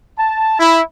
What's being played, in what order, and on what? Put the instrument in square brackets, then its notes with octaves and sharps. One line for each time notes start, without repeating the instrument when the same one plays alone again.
[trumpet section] A5
E4